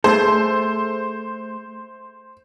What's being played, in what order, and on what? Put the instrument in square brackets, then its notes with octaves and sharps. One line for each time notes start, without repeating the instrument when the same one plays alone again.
[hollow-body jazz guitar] A3 G#4 A4 [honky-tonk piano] C5